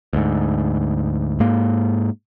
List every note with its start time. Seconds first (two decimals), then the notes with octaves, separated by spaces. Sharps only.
0.13 D2 G#2
1.40 G#2 A#3